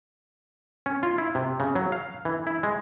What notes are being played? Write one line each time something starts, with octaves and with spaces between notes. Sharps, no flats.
C#4
F4
E4
C3
C#3
F#3
F5
E3
E4
G#3